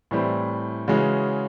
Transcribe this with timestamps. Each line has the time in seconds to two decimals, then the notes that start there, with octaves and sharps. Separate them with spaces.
0.11 A2 E3 G3 C4
0.88 C#3 E3 G#3 C#4 F#4